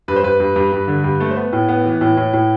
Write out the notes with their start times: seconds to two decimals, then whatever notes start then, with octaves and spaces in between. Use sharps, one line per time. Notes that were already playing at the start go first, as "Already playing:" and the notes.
0.08 G2 B4
0.16 C5
0.23 G2 B4
0.40 G2
0.56 G2
0.72 G2
0.88 D3
1.04 G2
1.20 A3
1.31 C5
1.37 B3 B4
1.53 A2
1.69 B3
1.85 E3
2.01 A2
2.17 A2
2.33 A2